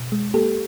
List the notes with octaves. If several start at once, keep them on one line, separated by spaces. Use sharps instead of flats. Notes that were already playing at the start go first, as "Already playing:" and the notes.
Already playing: B2
G#3
A#3 G4 A4